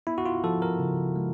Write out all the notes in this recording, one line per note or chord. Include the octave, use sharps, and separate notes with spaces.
B3 E4
F#4
F4
F3 A4
A#4
C#3
G#3